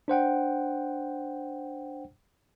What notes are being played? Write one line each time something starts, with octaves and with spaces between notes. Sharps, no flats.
D4 C5 F#5 G5